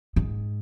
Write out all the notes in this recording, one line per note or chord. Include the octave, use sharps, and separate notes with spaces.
G#2